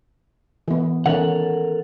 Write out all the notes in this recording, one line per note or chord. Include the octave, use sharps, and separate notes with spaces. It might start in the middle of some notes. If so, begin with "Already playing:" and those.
E3 B3
D#3 E3 C#4 A4 A#4 F#5